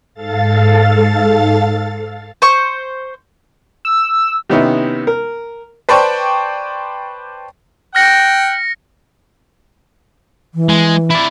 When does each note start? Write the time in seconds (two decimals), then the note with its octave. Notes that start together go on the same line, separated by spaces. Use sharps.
0.14 G#2 A4 F5 A6
2.42 C5 C#6
3.85 E6
4.50 C3 D#3 B3 C#4 D#4 E4
5.07 A#4
5.89 B4 C5 D5 G5 A5 C#6
7.95 F#5 G5 F6 A#6 C#7
10.54 E3
10.69 G#3
11.11 E4 D5